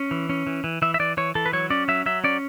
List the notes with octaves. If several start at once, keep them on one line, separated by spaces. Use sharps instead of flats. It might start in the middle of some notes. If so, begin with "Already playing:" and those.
Already playing: C#4
E3
C#4
E3
E3
E3 E5
E5
E3 D5
E3 C#5
E3 A4
B4
F#3 C#5
C#4 D5
F#3 E5
F#3 E5
C#4 D5